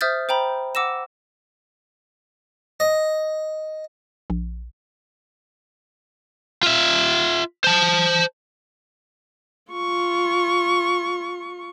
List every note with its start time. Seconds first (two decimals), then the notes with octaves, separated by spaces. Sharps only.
0.01 C5 E5 D#6 F6 G6 A6
0.29 C5 G5 A#5 B5
0.75 F#5 D6 E6 A#6 E7
2.80 D#5
4.30 A#1
6.63 F4 E5
7.64 C5 A5
9.72 F4 C#6